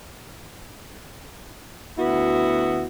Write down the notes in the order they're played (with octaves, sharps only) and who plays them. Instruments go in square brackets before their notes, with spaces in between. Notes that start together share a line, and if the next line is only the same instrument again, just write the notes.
[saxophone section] D2 B3 E4 F#4